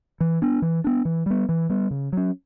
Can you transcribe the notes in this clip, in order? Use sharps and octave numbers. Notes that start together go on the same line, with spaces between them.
E3
B3 D4
E3
B3 D4
E3
G3 B3
E3
G3 B3
C#3
F#3 C#4